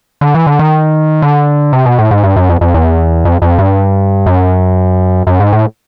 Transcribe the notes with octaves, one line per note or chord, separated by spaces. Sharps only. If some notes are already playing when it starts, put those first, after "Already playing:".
D3
E3
D3
D#3
D3
C3
B2
A2
G#2
G2
F#2
F2
F2
E2
F2
F2
G2
F#2
F#2
G#2
A2